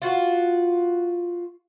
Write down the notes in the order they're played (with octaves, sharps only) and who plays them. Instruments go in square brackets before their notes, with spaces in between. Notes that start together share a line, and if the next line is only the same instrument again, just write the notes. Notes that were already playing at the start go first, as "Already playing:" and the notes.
[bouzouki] F4 F#4